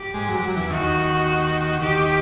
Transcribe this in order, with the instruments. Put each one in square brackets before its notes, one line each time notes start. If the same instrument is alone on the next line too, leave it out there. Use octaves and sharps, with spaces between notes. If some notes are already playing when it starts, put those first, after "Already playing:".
Already playing: [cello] G4
[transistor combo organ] G#2 G#3
F#2 F#3
F#2 F#3
E2 E3
[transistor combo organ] D#2 D#3 [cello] F#4
[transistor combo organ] D#2 D#3 [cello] G4